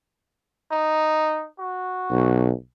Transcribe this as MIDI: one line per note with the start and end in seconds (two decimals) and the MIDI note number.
0.71 1.46 63
1.59 2.47 66
2.11 2.51 35